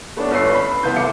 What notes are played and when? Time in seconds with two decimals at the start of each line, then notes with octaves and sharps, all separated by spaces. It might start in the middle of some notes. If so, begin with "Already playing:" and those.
0.17 A3 B3 C#4 D4
0.30 G1 C#4 B4 E6 C7
0.55 B5
0.83 C2 B3 B4 C6 G6
0.96 C2 A3 E4 F5 D6 C#7